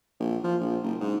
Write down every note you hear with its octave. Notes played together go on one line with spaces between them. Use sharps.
A#1
F3
A#1
F#1
G#2